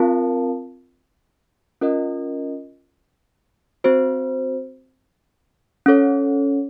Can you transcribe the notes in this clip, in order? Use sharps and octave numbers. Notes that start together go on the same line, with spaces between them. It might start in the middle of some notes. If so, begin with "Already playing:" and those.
Already playing: C4 F4 A#4 F5 A5
C#4 F4 A#4 D#5
C4 F#4 C5
C#4 A4 C#5